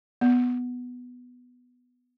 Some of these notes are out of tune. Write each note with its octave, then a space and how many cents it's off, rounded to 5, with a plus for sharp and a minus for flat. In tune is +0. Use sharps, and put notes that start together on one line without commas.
B3 +5